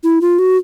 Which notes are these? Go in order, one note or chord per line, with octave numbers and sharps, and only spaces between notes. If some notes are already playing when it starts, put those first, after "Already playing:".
E4
F4
F#4